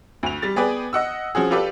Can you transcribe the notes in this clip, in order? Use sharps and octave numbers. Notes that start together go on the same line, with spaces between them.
D2 F7
G3 A6
B3 G#4 B4 D5 G5
D#5 F#5 E6
F3 C#4 F#4 G#4
F4 G4 A4 B4 D5